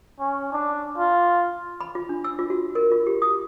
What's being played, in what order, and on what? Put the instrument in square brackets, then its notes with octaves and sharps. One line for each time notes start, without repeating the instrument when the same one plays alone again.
[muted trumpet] C#4
D4
F4
[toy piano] B5
F4
D4
E6
F4
F#4
A#4
F4
G4
D#6